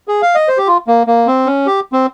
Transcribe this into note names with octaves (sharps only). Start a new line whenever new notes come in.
G#4
F5
D#5
C5
G4
F4
A#3
A#3
C4
C#4
G4
C4